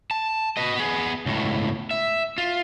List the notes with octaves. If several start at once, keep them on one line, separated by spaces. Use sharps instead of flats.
A5
B4 D#5
B3 G#4
C#2 A2
E5
F4